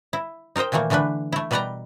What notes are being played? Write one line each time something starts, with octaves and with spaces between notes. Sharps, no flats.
E4
D#4 A#4 C5 D#5 G5
A#2 D#3 E3 A3 A#3
D3 E3 A3 D4 B4
A3 E4
B2 G3 B4 D5 G5 A#5